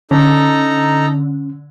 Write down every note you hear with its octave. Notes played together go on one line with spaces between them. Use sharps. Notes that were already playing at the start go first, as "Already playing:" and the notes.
D3 C#4 D#4 A4 A#5